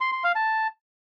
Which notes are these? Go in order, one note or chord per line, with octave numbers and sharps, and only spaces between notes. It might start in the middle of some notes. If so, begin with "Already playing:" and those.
C6
C6
F5
A5